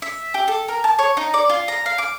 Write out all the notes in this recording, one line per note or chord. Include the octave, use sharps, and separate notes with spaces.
E5
G4
A4
A#4
A5
C#5
D#4
D5
F4
A#5
F5
D6